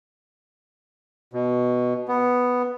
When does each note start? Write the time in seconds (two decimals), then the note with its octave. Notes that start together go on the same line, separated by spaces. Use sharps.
1.33 B2
2.08 B3